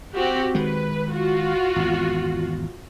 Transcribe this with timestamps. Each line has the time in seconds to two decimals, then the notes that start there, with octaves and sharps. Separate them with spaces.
0.13 C4 F#4 G4
0.55 D#3 G#3 B4
1.12 F4 F#4
1.76 G#1 E2